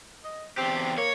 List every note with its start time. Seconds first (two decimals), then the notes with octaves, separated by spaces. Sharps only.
0.24 D#5
0.58 E2 C4 G4
0.98 A#3 C#5